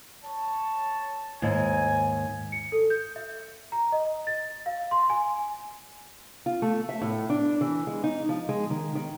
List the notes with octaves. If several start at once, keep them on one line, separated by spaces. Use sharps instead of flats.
C#5 A5
D#2 G#2 G#5
C#7
A4
G6
E5
A#5
D#5
A6
F5
C6
G#5
F4
A3
E5
A2
D4
E3
G#3
D#4
F3
G#3
D#3
D#3